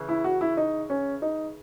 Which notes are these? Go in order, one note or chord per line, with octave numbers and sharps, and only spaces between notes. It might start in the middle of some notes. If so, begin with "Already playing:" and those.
Already playing: C#3 E3
E4
F#4
E4
D#4
C#4
D#4